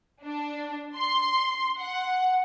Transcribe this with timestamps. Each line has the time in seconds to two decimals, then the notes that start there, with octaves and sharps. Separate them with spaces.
0.23 D4
0.97 C6
1.80 F#5